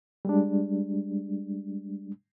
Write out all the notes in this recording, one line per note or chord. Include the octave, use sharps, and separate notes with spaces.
G3 G#3 D4